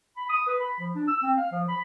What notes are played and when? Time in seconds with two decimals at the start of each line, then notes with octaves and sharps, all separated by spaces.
0.16 B5
0.30 D#6
0.47 B4
0.60 B5
0.80 F3
0.95 D4
1.08 E6
1.22 C4
1.37 F5
1.52 F3
1.68 B5